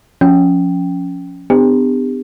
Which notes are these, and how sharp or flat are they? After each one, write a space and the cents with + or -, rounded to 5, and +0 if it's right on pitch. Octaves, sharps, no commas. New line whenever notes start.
F3 +25 C#4 +0 G5 +0
B3 +40 D4 +30 G4 +35